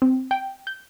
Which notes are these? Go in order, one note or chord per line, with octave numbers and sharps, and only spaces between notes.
C4
G5
G6